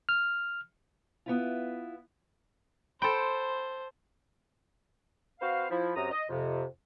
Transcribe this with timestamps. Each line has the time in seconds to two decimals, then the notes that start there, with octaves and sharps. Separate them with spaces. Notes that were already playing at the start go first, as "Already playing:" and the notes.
0.09 F6
1.26 B3 E4 F4
3.02 A4 C5 G5 B5 C6
5.40 C4 F#4 B4 C5 F5
5.70 F3 E4
5.96 F#2 C3 A#5 D#6
6.11 D#5
6.29 F2 C3